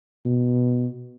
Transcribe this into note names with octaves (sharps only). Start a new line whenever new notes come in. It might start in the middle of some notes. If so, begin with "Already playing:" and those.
B2